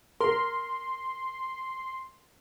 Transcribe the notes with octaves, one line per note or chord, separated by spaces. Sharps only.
A#4 C6